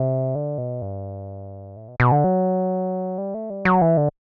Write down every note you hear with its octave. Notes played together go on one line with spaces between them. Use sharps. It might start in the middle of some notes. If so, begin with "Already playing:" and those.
Already playing: C3
D3
B2
G2
A2
B2
B2
D3
F#3
G3
A3
G3
F#3
E3
D3